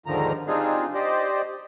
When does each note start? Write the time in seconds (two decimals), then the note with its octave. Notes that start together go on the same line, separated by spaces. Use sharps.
0.06 D#2 G#2 D3 D#3 F3 A#5
0.47 G3 C4 D4 D#4 F4 G#4
0.94 G4 C5 D5 D#5